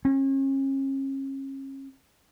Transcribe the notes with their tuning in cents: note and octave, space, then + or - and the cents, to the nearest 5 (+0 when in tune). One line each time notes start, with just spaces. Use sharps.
C#4 -35